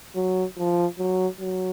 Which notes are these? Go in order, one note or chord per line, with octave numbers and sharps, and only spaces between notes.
F#3
F3
F#3
F#3